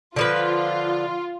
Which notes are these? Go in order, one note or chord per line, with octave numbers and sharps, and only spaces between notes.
D3 F3 F4 B4